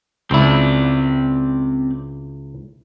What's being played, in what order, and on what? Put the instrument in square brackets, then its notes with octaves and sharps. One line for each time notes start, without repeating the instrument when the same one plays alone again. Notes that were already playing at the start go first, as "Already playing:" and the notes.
[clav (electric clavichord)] C#2 E4 [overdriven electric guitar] C4 D5